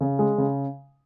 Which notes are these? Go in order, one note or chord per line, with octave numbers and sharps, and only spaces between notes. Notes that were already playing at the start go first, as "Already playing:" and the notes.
C#3
G#3
C#3